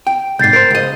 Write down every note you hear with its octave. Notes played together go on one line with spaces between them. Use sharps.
G5
C2 G#2 G6 A6 C7
A#4 C5
C#2 D#5